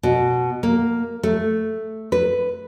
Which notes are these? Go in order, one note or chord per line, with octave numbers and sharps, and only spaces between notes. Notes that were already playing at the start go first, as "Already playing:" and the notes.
B2
A#3
A3
B4